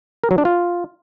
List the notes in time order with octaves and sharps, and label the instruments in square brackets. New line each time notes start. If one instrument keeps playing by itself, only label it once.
[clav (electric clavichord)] A#4
F#3
D4
F4